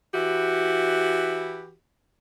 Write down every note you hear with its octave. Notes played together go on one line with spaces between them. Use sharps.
E3 E4 F#4 G4